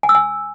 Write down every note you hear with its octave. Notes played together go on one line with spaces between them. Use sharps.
G#5
E6
G#5